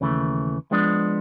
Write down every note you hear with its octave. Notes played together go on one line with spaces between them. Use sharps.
D#2 C#3 E3 A3
F3 G#3 B3 D4